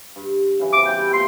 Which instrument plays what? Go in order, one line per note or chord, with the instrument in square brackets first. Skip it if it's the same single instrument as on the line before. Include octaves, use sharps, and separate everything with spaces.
[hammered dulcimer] G2
C#3 E3 F#3
[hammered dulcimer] C#3 C4 [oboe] D6
[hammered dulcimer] G3 B3 E4 [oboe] G5
[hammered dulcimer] A#2 E5 F5 [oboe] C6